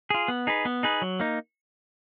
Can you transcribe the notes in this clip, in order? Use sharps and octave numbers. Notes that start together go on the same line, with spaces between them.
F4 G#4
B3
D#4 G#4 B4
B3
D#4 G#4 B4
F#3
A#3 D#4